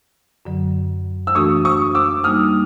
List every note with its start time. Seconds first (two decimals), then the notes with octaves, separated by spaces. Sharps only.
0.45 F#2 D3 F#3
1.27 E6
1.35 E3 A3 D4 F#4 A4 C#6 D#6
1.65 C#6 D#6
1.95 D6 E6
2.24 G3 A#3 D#4 D#6 F6